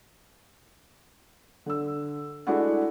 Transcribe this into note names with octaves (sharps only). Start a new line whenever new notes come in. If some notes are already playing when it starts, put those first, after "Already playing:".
D3 E6
G#3 A3 D4 E4 F#4 F#5